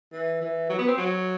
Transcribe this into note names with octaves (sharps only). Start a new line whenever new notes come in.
E3
E3
F#3
B3
C4
F#3